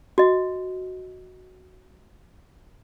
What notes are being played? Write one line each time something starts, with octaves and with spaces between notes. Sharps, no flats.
F#4 D#5